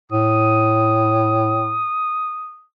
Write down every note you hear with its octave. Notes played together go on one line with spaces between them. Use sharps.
A2 D#6